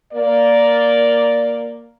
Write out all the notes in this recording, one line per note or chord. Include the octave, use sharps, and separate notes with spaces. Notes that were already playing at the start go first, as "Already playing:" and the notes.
A#3 A#4 D5